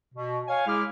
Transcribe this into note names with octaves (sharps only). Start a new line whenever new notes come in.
B2
C#5 F5 G#5
G#3 E4 G#4 D6 F6